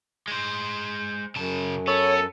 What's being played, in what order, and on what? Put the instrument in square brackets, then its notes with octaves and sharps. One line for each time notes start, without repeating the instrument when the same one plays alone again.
[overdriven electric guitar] G#3 C5
[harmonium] F#2 [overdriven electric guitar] C#3 A5
[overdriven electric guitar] B3 [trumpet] A4 [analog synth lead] C#5